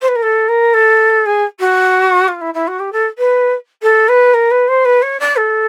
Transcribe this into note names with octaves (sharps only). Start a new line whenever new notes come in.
C5
B4
A#4
A4
A#4
A4
G#4
F#4
F4
E4
E4
F#4
G4
A4
B4
A4
B4
A#4
B4
C5
B4
C#5
D5
A4